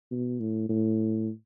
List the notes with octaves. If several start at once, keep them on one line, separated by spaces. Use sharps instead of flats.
B2
A2
A2